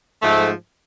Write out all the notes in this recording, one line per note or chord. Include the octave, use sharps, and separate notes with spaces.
G#2 F3 A3